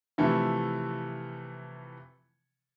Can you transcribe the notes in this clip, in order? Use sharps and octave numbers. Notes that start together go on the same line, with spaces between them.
C3 E3 F3 A3 E4